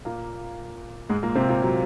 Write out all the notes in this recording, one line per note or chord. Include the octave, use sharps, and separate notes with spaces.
A#2 A#3
G#2 G#3
A#2 A#3
C3 C4
A#2 A#3
F#3